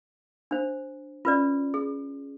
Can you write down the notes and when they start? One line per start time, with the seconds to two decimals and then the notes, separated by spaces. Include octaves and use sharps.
0.51 D4 C5
1.25 C#4 F4 B4 D5
1.74 G#4